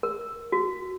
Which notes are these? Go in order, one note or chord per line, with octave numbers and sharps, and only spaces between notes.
A#4
F#4